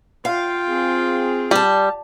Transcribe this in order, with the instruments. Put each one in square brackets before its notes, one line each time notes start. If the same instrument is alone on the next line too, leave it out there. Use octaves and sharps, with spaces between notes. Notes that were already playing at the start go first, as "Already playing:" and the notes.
[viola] F4 G5 [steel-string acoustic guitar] F5
[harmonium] C4 G#4
[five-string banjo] G3 [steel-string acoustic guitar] G#5 A5